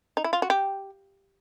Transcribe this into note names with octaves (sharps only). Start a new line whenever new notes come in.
D#4
E4
F4
F#4
G4